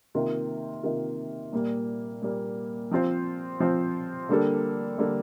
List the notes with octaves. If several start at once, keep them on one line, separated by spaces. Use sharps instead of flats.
C3 D#3 A#3 F4 A#4
C3 D#3 A#3 F4 A#4
A#2 G3 A#3
A#2 G3 A#3
F3 C4 F4 C5
F3 C4 F4 C5
D3 G3 A#3 D4 A4
D3 G3 A#3 D4 A4